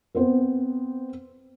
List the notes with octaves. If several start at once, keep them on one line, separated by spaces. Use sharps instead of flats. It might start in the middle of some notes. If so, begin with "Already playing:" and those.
B3 C4 C5